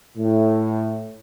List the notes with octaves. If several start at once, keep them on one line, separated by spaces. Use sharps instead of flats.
A2